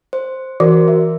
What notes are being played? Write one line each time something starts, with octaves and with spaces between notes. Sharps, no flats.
C5
E3 F#4 A#4 C5
E5